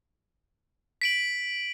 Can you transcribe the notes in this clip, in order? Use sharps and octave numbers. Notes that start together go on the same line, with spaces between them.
B6 D7 F#7